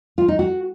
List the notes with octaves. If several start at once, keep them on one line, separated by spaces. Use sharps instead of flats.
F4
D#4
F#4